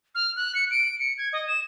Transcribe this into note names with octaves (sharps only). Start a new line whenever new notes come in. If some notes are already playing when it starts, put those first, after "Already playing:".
F6
F#6
C#7
D7
C#7
G#6
D#5
E7